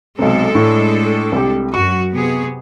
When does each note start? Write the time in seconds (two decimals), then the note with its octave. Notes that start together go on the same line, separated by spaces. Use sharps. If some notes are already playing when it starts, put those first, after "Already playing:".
0.19 B1 C3 G#3 D4 A4
0.55 A2
1.32 C2 G4
1.74 F#2 F#4 C#6
2.13 C3 B3 G#4